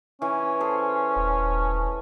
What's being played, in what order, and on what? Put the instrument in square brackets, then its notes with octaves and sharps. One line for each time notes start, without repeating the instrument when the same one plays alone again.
[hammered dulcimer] E3 [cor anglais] C#4
[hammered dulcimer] G#4 A4 C5
[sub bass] D#1